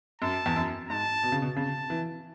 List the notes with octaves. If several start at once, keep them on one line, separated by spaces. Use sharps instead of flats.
F#2 A5
E2
F#2
G#2 A5
B2
C#3
B2
C#3 A5
E3